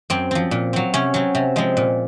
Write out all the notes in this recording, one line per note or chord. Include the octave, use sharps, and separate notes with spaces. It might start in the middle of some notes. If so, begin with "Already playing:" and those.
F#2 C4
F3 C4
A#2
F#3 C4
C3 C#4
F#3 C4
C3
F3 G#3 C4
A#2